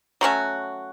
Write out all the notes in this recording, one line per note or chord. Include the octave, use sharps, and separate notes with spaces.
F#3 A3 C#4 F#4